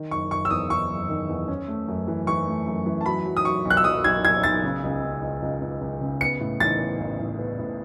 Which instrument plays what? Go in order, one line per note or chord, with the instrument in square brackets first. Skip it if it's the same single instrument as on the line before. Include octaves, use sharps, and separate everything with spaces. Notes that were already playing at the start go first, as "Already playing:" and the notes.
Already playing: [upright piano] D#3
[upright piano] F#1 [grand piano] C#6
[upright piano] F#1 [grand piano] C#6
[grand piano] E6
[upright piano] E2 [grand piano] D#6
[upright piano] E2 [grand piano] C#6
[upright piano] F#1
D#3
E2
C#4
A3
F#2
E3
[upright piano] E3 [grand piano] C#6
[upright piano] A3
F#2
E3
[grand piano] A5
[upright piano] F#3 [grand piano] B5
[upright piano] F#3
[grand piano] D#6
[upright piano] F#3 [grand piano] C#6
[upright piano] B1
[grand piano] F#6
E6
[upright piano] F#3 [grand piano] D#6
[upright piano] B1 [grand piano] G#6
[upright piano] B1 [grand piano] G#6
[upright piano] B1 [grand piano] A6
[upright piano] C#3
C#2
C#3
C#2
C#2
C#2
C#2
C#3
[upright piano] B3 [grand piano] C#7
[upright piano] A2
[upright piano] E3 [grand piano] A6
[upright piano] B3
A1
A1
B3
A2